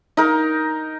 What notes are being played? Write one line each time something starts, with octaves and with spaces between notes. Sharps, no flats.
D#4 A#4